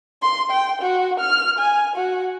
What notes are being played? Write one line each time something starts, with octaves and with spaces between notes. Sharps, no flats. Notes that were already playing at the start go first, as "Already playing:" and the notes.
C6
G5
F#4
F6
G#5
F#4